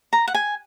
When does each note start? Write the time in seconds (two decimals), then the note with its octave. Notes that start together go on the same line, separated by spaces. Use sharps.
0.13 A#5
0.28 F#5
0.34 G#5